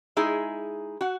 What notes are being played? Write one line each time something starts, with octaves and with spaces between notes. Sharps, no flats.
G#3 D#4 E4 G#4
F#4 F#5